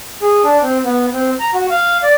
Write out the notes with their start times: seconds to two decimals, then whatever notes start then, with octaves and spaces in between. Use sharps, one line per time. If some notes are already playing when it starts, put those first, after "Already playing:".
0.22 G#4
0.44 D4
0.62 C4
0.85 B3
1.13 C4
1.40 A#5
1.54 F#4
1.70 F5
2.03 D5